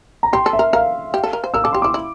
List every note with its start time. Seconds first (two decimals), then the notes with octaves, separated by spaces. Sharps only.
0.23 A#5
0.33 G4 C6
0.46 A4
0.53 E5
0.59 A#4
0.73 A#4 F5
1.14 G4
1.24 A4
1.33 A#4
1.44 C5
1.54 A#4 E6
1.64 A4 D6
1.73 G4 C6
1.82 E4 D6
1.94 E4